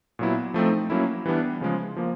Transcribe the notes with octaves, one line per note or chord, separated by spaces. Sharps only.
A#2 F#3 B3 E4
F3 A3 C4 D#4
F#3 A#3 C#4 E4
E3 G3 B3 D4
C#3 F3 G#3
F3 A#3